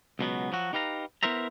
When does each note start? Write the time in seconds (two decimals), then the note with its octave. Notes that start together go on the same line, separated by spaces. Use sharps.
0.19 C#2 B2 F#3 B3
0.52 F3 F#3 F#4
0.73 D#4 G4 B4 F5 A#5
1.23 B3 E4 A#4 C5 E5 A#5